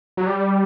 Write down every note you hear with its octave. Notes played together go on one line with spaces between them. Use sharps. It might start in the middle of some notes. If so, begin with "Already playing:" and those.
F#3
G3